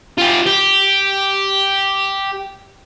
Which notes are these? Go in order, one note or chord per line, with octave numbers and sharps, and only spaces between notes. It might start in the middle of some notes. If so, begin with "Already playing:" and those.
F4 G4
G4